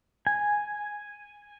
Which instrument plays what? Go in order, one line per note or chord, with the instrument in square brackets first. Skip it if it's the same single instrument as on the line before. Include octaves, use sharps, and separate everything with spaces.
[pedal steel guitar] G#5